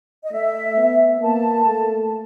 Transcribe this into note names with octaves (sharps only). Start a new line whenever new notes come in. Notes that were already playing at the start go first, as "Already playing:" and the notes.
D#5
A3 E5
B3
A#3 A5
A3